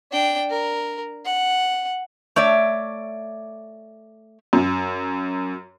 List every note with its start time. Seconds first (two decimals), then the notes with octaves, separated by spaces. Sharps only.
0.12 D4 G5
0.50 A#4
1.25 F#5
2.36 A3 C#5 D5 E5
4.53 F#2